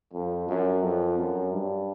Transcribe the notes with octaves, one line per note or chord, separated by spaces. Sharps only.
F2
F#2
F2
F#2
G2